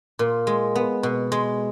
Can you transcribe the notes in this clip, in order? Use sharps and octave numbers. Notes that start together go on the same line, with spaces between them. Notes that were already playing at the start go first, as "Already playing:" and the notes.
A#2
G#3
B3
B2
G#3